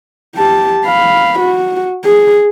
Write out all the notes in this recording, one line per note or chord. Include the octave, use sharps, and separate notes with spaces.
G4 A5
F5 B5
F#4
G#4